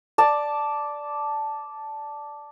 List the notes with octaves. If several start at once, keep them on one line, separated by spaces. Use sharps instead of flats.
D5 A5